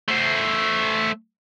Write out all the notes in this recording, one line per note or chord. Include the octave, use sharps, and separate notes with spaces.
A3 C5